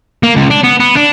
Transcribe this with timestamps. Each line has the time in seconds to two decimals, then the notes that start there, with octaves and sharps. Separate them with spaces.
0.23 A#3
0.35 C#2
0.50 D4
0.63 B3
0.80 B3
0.97 D4